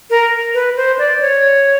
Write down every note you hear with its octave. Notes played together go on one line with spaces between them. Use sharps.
A#4
B4
C5
D5
C#5